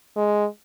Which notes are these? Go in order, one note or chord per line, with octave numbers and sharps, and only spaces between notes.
G#3